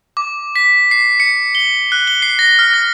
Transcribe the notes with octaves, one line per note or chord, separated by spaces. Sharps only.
D6
B6
C7
C#7
G7
F#6
G7
C7
A#6
F6
A#6